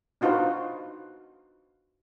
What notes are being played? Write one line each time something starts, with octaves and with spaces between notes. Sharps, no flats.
D4 D#4 F4 F#4 B4 C5